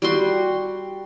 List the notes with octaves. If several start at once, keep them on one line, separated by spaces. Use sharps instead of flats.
G3 F#4 C6